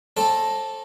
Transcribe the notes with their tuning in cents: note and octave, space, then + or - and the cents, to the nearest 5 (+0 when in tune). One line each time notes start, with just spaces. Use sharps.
C4 +30 A4 +0 D5 -40